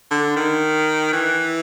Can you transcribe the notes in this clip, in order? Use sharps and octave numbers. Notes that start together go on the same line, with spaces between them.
D3
D#3
E3